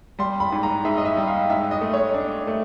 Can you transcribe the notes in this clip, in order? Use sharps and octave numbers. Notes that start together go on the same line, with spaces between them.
G3 C6
B5
G#2
A#5
G#2 E5
D#5
E5
G3
F5
G#2 E5
D#5
A3
C#5
D4
A3